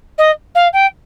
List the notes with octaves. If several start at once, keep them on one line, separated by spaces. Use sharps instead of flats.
D#5
F5
G5